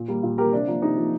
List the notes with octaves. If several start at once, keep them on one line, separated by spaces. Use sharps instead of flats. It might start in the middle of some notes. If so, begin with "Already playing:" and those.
Already playing: A#2
G3 A#3
A#2
G3 A#3 G4 A#4
C3 D4
F3 A#3
C3 D#4
F3 A#3